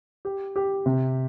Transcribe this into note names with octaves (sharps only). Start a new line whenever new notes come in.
G4
G4
C3